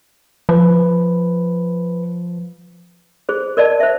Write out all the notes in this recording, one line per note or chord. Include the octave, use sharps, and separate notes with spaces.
F3 B4
G#4 C5
A#4 D5 D#5 A5
C5 E5